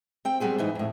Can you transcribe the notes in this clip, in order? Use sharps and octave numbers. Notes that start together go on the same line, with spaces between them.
C4 G5
F#3 G3 B3 C4 G#4
G#2 E3 D#4
F2 A2